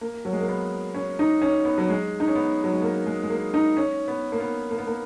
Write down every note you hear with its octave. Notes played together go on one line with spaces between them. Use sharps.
A#3
F#3
G#3
A#3
B3
C#4
D#4
C#4
B3
F#3
G#3
D#4
C#4
B3
F#3
G#3
A#3
G#3
G#3
A#3
D#4
C#4
B3
A#3
B3
A#3
B3
A#3